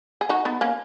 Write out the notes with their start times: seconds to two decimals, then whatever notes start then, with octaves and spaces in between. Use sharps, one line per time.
0.21 G#4
0.29 D#4 F#4
0.45 B3 D#4
0.61 A#3 C#4